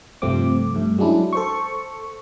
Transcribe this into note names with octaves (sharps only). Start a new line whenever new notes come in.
G2 C3 F3 A3 C4 D6
G2 A3
F#3 G#3 C#4 D4 E4
A4 C5 C#6